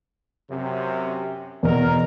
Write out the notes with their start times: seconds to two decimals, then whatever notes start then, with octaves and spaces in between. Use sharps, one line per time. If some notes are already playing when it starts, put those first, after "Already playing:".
0.49 F#2 C3
1.63 E2 B2 B3 A#4